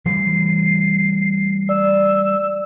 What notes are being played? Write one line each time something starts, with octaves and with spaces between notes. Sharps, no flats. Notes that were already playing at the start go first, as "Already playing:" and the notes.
E3 G3 A3 C7
D5 E6